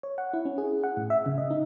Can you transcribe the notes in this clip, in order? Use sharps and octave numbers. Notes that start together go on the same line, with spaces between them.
C#5
F#5
E4
C#4
G#4
F#5
A2
E5
C#3
D#5
D#4